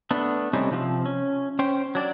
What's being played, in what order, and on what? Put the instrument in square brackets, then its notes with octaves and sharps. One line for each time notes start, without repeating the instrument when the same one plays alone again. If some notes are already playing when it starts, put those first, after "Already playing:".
[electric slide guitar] A3 B3 D4
C3 G3 A3 C4 C#4 D#4
C3 F3 A#3 C4
C#4
C#4 C5 G5
F#3 D4 D5